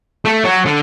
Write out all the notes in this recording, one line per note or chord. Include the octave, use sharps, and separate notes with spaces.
A3
F#3
D3